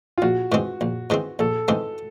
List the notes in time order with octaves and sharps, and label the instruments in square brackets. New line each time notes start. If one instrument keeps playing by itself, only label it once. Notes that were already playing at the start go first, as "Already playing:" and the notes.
[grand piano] F4
[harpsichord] A#1 [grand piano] F#4
[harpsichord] G#2 E3 G#3 C4
A#1
G#2 E3 G#3 C4
[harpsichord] A#1 [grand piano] A4
[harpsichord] G#2 E3 G#3 C4